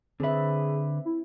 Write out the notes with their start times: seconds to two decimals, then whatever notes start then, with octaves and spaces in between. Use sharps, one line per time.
0.20 D3 C4 G#4 B4 E5
1.05 E4